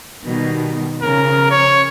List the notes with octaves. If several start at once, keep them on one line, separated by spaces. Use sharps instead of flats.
B2 D#3 G3
C#3 F3 A#4
C#5